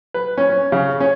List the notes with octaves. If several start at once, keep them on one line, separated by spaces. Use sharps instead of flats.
B4
C#4
C#4
C#3
C#4